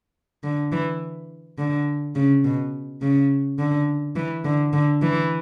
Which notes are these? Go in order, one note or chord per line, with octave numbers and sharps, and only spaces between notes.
D3
E3
D3
C#3
B2
C#3
D3
E3
D3
D3
E3